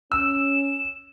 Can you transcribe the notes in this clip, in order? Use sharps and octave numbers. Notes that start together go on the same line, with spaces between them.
C#4 E6 E7